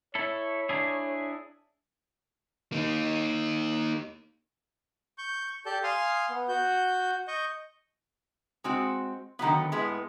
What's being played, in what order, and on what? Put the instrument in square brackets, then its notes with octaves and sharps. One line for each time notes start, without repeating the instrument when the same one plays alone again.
[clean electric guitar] E4 A4 [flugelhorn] C#5
[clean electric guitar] D4 E4 G#4
[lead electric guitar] A#3 D#4
[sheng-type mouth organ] C#6 G6
G4 A4 D5 A5 G6
F5 G#5 C6 D#6 F6
B3
F#4 G6
D#5 C#6 G6
[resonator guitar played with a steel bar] G#3 C4 F#4
D3 D#3 F#3 B3
A2 G#3 B3